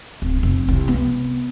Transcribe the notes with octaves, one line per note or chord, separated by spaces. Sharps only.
D1
F1
C2
B3